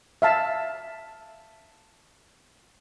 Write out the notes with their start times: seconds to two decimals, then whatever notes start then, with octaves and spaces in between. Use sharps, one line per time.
0.22 E5 F5 A5